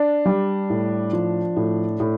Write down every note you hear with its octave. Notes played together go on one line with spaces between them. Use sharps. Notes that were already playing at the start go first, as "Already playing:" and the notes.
Already playing: D4
G3
A2
F3
A2
A2